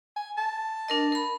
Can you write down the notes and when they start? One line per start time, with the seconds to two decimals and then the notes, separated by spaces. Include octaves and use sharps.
0.16 G#5
0.37 A5
0.88 D4 A#4 D#5
1.12 A#4 B5